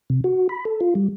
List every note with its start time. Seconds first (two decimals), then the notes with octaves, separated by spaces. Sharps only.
0.10 C3
0.24 F#4
0.49 B5
0.65 A4
0.81 F4
0.95 G3